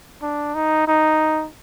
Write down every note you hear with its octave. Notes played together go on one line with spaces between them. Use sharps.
D4
D#4
D#4